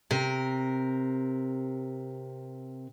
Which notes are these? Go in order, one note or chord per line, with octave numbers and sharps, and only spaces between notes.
C3 A#4